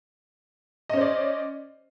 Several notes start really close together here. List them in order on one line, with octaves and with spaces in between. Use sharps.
D#5 C#4 C5 D5